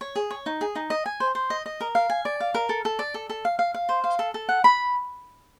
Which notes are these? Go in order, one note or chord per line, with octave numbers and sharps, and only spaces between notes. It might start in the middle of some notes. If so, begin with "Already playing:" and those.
C#5
G#4
C#5
D#4
G#4
D#4
D#5
G#5
C5
C5
D#5
D#5
A#4
F5
G#5
D5
F5
A#4
A4
A4
D5
A4
A4
F5
F5
F5
C5
F5
A4
A4
F#5
B5